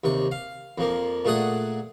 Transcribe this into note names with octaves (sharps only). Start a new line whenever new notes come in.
D#2 C3 C#6
F5
F2 F3 A#3
A#2 A3 G#4 F#5 D#6